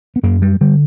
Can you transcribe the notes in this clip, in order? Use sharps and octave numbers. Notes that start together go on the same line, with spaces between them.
B3
F#2 A#3
G3
D3 G3